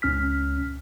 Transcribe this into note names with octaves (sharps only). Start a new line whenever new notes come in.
C#2 C#4 F6 B6